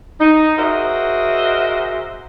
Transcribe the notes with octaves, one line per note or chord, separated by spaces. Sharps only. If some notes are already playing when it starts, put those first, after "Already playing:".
D#4
F#4 G#4 A#4 C5 D#5 E5